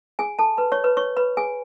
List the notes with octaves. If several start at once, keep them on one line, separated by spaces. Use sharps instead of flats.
G#4 G#5
A4 A5
B4 B5
C#5 C#6
B4 B5
C#5 C#6
B4 B5
G#4 G#5